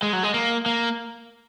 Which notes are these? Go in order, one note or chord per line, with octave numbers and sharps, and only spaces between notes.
G#3
F#3
G#3
A#3
A#3